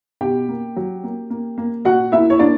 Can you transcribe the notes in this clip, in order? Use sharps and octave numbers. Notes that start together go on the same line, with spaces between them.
B2 G4 G5
A#3
F#3
A#3
A#3
A#3
A#2 F#4 F#5
A#3 E4 E5
C#5
A#3 D4 D5